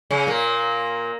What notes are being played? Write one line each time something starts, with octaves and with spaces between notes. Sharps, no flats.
C#3 C#4
A#2 A#3